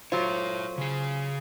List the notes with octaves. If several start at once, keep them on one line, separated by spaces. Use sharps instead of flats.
F#3 F4 A4 C5 C#5
C#3 G#4